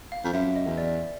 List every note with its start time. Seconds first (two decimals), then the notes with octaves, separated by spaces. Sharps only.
0.12 F5
0.24 F2
0.33 F#2 E5
0.56 D#5
0.66 E2
0.78 D5